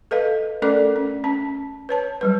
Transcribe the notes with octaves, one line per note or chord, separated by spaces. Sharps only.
A4 B4 D#5 F5
A3 C#4 A4 A#4 D5 D6
C#4
C#4 A5
B4 C#5 A5
F#3 G3 B4